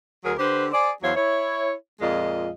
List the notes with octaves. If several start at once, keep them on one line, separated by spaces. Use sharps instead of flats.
D2 F#3 G#4 A#4
D3 G4 B4 C5
G#4 C5 D5
E2 F#3 C5 C#5 F5
E4 C#5
F2 A#2 G#3 F4 D#5